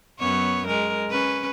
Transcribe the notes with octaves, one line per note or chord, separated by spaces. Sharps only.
F#2 B3 C#5
G#3 A#4
C#4 B4